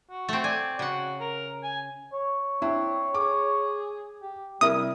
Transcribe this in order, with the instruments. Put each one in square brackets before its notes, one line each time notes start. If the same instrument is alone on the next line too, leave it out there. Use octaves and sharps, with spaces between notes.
[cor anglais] F#4
[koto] A3 C4
[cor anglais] D5 [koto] G#5
[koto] C#3 F#5 [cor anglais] F#4
[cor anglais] A#4
G#5
C#5
[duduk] C4 [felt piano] D4 E4
[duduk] G#4 [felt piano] D6
[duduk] G4
[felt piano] C3 E4 A#4 [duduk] G3 [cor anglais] E5 [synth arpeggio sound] D#6